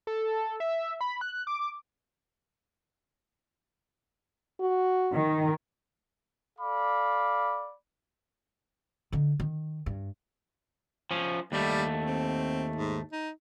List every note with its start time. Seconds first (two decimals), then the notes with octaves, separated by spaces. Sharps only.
0.07 A4
0.60 E5
1.01 B5
1.21 F#6
1.47 D6
4.60 F#4
5.12 D#3
6.59 A4 D5 F5 B5 D6
9.12 D3 D#4
9.40 D#3
9.86 G2
11.11 F3 C#4
11.52 D#2 G3 A3
12.06 C4
12.76 G#2
13.12 D#4